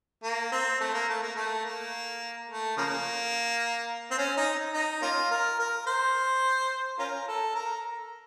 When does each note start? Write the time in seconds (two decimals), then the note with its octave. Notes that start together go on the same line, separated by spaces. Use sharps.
0.24 A#3
0.52 C4
0.80 A3
0.94 A#3
1.09 A3
1.22 A#3
1.36 A3
1.65 A#3
2.49 A3
2.77 C#3 F3 A#3
4.11 C4
4.18 C#4
4.37 D#4
4.74 D#4
5.02 A#3 C#4 F4
5.31 A#4
5.59 A#4
5.87 C5
6.99 C#4 F4 A#4
7.28 A4
7.55 A#4